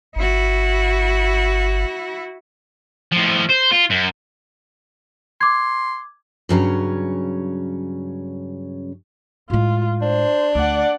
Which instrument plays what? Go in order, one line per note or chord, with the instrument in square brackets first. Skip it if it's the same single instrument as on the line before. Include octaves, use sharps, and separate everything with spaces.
[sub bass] G1 [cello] E4 F#4
[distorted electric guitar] A2 F3
C5
F4
F#2
[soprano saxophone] C6 [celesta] D6 G#6
[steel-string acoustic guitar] G2 C#3 F#3 C#4
[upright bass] A2 G#3 [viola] F4
[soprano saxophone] D4 [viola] C5
[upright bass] D2 [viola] D5 F#5